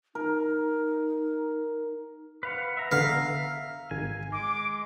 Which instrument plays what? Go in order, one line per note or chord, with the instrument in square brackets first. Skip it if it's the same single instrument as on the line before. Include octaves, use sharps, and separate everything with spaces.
[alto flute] D#4 [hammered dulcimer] A#4
[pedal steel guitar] B4 F5 F#5
E5 A#5
[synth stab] D3 B3 [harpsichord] F5
[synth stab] G#1 [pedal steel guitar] G#5
[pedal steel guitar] G#3 [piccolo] D6